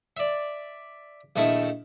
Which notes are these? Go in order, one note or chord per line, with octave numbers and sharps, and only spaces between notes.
D5 E5
A#1 D#3 A3 E4